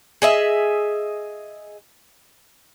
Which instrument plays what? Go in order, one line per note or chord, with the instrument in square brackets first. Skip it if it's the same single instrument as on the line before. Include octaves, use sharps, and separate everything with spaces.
[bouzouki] G#4 D#5 E5